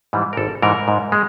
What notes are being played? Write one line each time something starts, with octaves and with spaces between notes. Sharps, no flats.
G#2 E3 G3
A#4
G#1 A4
G#2 E3 G3 A#4
G#2
G#3